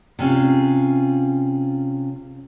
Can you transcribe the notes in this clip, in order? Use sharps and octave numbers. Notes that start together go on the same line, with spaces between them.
C3 C#4 F4 G#4